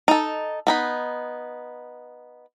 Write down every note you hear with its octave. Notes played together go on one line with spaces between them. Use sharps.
D#4 A4
B3 D#4 B5